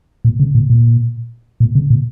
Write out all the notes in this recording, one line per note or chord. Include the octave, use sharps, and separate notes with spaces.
A#2
C#3
A#2
A#2
A#2
C#3
A#2